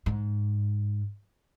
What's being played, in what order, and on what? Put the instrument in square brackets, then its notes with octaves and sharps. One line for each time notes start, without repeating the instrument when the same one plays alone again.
[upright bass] G#2